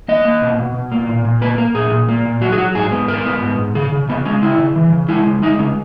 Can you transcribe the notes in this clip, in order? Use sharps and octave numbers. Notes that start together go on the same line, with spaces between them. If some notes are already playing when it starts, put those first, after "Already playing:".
A#3 D#5
A#3
B2
B2
B2
A#3
A#2
A#2
A#3 B4
A#3 A#4
A#2 G#4
A#2
A#3
A#2
F#3 F#4
G#4
F#3 F#4
G#2 G#4
B3
G#2 A#4
B3
G#2
G#2
C#3 G#4
C#3
C#3 B3
G#3 C#4
C#3 E4
C#3
E3
C#3
G#3 E4
C#3
G#3 D#4
C#3 C#4